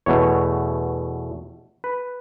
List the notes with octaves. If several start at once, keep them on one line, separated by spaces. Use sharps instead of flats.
E2 B2 A3 C#5
B4